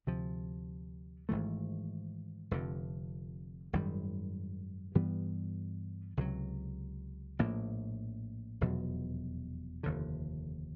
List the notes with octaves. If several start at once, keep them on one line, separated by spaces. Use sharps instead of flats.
D2 C3 F3
G#1 G#2 E3 A3
F1 F2 D3
G#1 F#2 D#3 G3
G2 E3 G3 B3
C#2 C3 D#3 F#3
A#1 A2 F3 A#3
F1 E2 B2 F#3
F1 D#2 D3